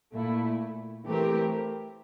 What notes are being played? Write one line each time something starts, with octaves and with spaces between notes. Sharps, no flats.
A#2 A3 E4
E3 A3 C4 G4 A#4